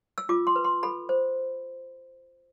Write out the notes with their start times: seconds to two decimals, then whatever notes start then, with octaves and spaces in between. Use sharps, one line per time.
0.18 E6
0.29 F4 D6
0.47 C6
0.56 B4
0.64 C6
0.83 A4 B5
1.09 C5